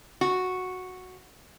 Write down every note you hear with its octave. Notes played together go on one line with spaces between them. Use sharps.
F#4